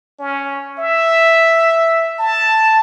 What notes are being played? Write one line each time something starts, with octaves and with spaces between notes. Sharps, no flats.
C#4
E5
A5